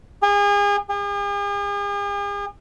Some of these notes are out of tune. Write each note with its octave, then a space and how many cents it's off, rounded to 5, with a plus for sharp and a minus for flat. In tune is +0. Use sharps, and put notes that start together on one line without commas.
G#4 -35
G#4 -45